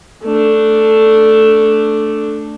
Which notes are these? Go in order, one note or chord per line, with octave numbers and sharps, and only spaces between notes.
A3 D4